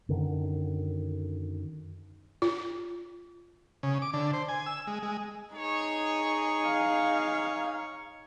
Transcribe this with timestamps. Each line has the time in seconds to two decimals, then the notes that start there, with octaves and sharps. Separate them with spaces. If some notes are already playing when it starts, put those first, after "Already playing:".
0.09 F#2 D3 D#3
2.42 F4
3.83 C#3
4.02 D6
4.14 D3
4.33 C5
4.49 G#5
4.66 E6
4.87 G#3
5.03 G#3
5.55 D#4 G#4 C#5
6.66 F5